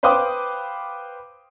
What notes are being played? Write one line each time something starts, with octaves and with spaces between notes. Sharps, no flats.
B4 C5 F5 G5 D6 D#6